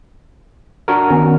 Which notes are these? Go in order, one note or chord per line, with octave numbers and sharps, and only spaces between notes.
D4 F#4 A#4
D#3 B3 C#4